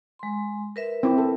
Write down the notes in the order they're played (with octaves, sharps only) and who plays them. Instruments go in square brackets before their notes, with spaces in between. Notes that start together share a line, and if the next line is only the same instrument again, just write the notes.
[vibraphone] G#3 C6
A#4 B4 E5
[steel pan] C4 E4
A4